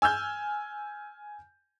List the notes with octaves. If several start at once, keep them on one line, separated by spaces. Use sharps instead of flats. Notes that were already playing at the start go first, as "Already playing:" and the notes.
G#5 E6 F6 G6